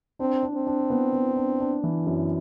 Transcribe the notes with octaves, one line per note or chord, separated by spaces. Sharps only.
C4 D4
D4
C4
D4
B3
B3
D4
D4
E3
F#2